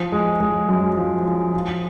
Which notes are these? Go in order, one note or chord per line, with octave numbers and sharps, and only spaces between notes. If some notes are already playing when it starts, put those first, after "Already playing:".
Already playing: F3
G#3
G#3
F#2
F3
F3
F3